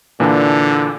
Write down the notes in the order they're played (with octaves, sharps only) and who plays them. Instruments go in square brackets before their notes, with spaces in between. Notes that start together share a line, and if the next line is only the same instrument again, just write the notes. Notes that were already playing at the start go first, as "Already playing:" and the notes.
[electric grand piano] A#2 E3 D4 [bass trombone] D3